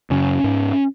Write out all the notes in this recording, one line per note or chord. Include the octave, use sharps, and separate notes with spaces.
F#2 C#3 C#4
G#2